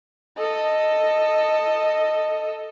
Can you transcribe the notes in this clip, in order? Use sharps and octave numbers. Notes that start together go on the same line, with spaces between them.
A4 D#5